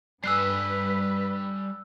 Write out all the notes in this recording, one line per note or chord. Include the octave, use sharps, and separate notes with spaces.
G2 G3 B4 G#5 E6 F#6 C7